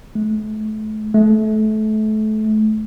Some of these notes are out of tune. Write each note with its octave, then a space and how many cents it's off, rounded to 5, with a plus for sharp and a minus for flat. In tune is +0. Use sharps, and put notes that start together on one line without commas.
A3 -35
A3 -30